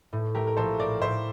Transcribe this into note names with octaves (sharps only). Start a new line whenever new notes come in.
A2
A3 G4 A#4
A#4
A#1 A4 C5
A2 A#4 D5
A2 C5 E5